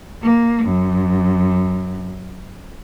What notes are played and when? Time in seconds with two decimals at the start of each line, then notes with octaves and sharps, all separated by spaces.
0.23 A#3
0.65 F#2